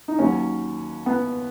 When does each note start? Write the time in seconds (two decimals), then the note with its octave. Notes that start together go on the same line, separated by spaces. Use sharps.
0.08 D#4
0.19 D#2 D#3 F#3 C#4
1.06 B3